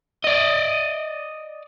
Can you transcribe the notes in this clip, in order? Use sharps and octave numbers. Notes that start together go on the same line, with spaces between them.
D5 D#5